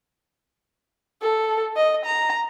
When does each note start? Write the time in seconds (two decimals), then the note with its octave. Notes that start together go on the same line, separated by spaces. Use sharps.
1.22 A4
1.76 D#5
2.06 A#5